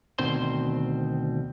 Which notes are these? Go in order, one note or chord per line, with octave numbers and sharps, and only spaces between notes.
D2 B2 D#3 C4 C5 C6